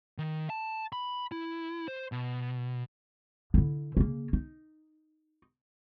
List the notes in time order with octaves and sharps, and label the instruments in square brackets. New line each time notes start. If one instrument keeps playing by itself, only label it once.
[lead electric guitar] D#3
A5
B5
E4
C5
B2
[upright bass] D3 E4
C#3 A#3
D#4